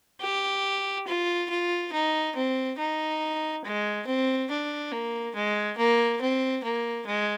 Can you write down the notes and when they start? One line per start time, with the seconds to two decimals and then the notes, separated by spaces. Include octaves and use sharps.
0.21 G4
1.07 F4
1.50 F4
1.93 D#4
2.36 C4
2.79 D#4
3.65 G#3
4.07 C4
4.50 D4
4.92 A#3
5.35 G#3
5.78 A#3
6.22 C4
6.64 A#3
7.07 G#3